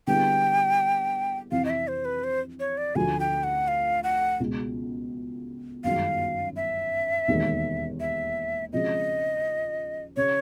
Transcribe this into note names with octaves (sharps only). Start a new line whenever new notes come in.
D3 G3 B3 E4 G#4 G5
F2 C3 E3 F5
D#5
E5
C5
B4
C5
C#5
D5
D2 D3 F3 A3 G#5
G5
F#5
F5
F#5
C#2 B2 G#3
G1 F#2 D#3 G#3 F5
E5
E1 D#2 D#3
E5
C#3 F3 G#3 C4 D#5
C#3 C#5